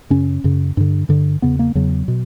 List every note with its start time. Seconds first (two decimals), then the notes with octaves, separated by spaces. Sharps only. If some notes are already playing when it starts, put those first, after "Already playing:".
0.10 F#2 C#3 C#4
0.44 F#2 C#3
0.77 G2 D3
1.09 G2 D3
1.42 E2 C#3 B3
1.59 A#3
1.75 E2 C#3 F#3
2.08 B2